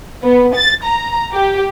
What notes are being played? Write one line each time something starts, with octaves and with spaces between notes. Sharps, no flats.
B3
A6
A#5
G4